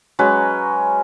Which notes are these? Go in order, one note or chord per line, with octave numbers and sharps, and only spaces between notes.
F#3 G#3 C#4 B4